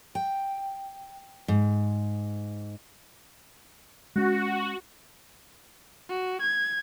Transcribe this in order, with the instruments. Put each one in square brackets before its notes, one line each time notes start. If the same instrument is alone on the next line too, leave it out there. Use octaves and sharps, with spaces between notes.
[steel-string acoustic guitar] G5
G#2
[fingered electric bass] G#3 C#4 [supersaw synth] F#4
[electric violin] F#4
G#6